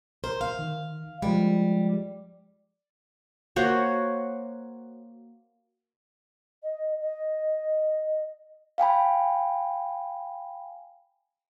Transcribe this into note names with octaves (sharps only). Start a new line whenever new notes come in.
A#4 C5
F5
D#3
F3 G3 G#3
A#3 F#4 C5 C#5
D#5
D#5
F5 G5 G#5 B5